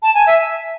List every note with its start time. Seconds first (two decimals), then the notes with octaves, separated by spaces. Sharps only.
0.03 A5
0.15 G#5
0.27 E5